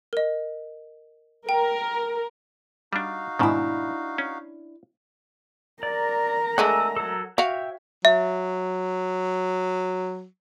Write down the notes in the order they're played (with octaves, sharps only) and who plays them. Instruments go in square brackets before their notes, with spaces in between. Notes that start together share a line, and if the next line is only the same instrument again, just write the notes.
[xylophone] A#4 D#5
[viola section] A#4 [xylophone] G5
[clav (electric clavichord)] G3 D4 [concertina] D#4 F#4 F5
[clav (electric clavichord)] G#2 B2 D#3 [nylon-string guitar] D4 E4
[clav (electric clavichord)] C#4
[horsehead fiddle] A#4 A#5 [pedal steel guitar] D5
[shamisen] G#3 A3 D4 [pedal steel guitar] F#5 G#5 E6
[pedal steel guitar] F#3 A4
[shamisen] F#4 F5 [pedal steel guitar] C#5 E5 G5
[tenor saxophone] F#3 [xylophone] E5